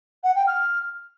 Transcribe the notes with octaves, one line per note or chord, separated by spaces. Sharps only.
F#5
G5
F6